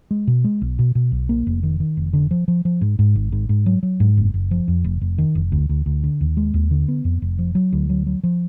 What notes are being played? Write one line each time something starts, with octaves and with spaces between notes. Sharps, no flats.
G#3
B2
G#3
B1
B2
B2
B1
A#3
F1
D#3
D#3
F1
D3
F3
F3
F3
G#2
G#2
G#1
G#2
G#2
F#3
F#3
G#2
F#1
F#1
F3
F2
F1
F1
D#3
F1
D2
D2
D2
D3
D#2
G#3
D#2
D3
B3
F2
F1
F3
F#3
D2
F#3
F#3
F3